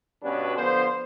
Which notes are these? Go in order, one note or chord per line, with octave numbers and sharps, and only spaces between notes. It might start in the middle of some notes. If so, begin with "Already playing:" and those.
G2 B2 C#4 D4 F#4 B4
D3 F3 B3 C5